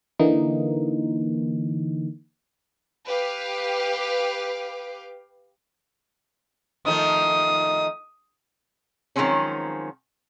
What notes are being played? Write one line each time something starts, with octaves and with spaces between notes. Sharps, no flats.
D3 E3 A#3 D#4
G4 B4 F5 D6
D#3 F3 A3 D#6
D#3 F3 F#3 G#3 C4 C#4